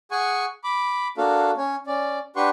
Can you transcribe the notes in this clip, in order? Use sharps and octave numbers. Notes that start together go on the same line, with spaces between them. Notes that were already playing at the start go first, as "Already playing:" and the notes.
G#4 F#5 G#5 C#6
B5 D6
A#3 D4 F#4 A4 F5
C#4 C#5
C#4 D5
D4 G4 B4 F#5 C6 C#6